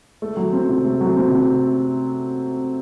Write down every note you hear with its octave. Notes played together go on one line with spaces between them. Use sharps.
A3
F#3
C4
C3
A3
F#3
C4
C3